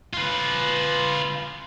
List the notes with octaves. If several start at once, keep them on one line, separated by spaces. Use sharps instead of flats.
F4 B4